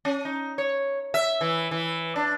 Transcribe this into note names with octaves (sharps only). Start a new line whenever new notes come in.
C#4
D#4
C#5
E5
E3
E3
D4